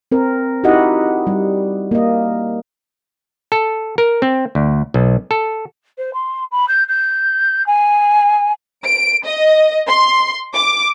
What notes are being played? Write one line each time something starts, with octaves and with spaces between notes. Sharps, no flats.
C4 A#4
D#4 E4 F#4 G4 D#5 F#5
G3
A#3 D#5
A4
A#4
C4
D2
B1
A4
C5
C6
B5
G6
G6
G#5
D7
D#5
C6
D6